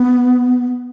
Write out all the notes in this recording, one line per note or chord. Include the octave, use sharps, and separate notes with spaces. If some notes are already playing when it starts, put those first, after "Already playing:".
Already playing: B3